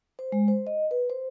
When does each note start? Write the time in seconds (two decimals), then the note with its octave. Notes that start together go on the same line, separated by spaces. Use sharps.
0.19 C5
0.32 G#3
0.48 C5
0.67 D#5
0.91 B4
1.10 C5